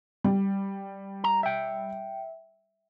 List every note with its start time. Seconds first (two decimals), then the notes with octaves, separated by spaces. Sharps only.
0.24 G3
1.24 A#5
1.43 E5 G5